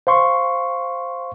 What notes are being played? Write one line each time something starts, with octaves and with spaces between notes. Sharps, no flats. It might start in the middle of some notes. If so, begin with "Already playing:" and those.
C5 F5 C6 C#6